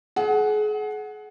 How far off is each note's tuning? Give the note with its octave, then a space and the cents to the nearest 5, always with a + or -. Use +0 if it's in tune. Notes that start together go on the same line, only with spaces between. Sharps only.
G#4 +35 F#5 +0